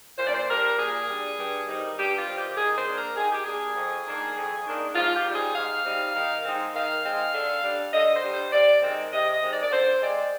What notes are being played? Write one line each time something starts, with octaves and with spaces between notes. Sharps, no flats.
A#2 C5
D5
C5
G3 D4 A#4
A#2 G#4
G3
D4
G2
D#3 G3 C4 D#4
G2 G4
F4
D#3 G3 C4 D#4
G4
D#3 G#4
C5
A#3 D4
A#4
D#3 G#4
G4
A#3 D4 G#4
F2
D#3 A#3 D4
F2
D#3 A#3 D4
G#2 F4
G4
G3 C4 D#4
G#4
G#2 F5
G3 C4 D#4
D#3
G#3 C4 D#4
D#3 F5
G#3 C4 D#4
D3
G3 D4
D3 D#5
C5
G3 D4
C5
C3 D5
D#3 G#3 C4
C3 D#5
D#5
D#3 G#3 C4
D5
D5
D3 C5
G#3 C4 D5